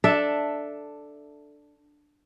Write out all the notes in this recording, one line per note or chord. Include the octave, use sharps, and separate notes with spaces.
D4 A4 E5